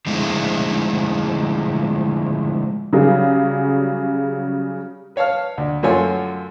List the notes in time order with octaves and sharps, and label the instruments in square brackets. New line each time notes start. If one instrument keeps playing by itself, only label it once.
[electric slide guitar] D3 F3 G#3 A3 D#4 E4
[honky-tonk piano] C#3 F#3 G3 G#4
[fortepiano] B4 C#5 F5 A5 F6
D2
F#2 F#3 A3 F4 C#5 G#5